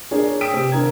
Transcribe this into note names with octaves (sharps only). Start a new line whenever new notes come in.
D4 G#4 A#4 C#5 D5
G5 D#6 E6 B6 D7 E7
C3 G4
G#1 D3 A#4 G#6